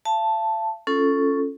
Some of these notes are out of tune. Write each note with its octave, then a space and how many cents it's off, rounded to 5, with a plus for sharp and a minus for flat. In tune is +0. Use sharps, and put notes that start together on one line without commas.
F5 -45 A5 +0
C#4 +0 F4 -15 A4 +0